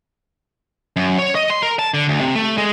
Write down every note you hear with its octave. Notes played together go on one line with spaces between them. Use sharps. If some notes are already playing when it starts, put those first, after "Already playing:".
F#2
C#5
D#5
C6
A#4
A5
D3
D2
C3
A3
G#3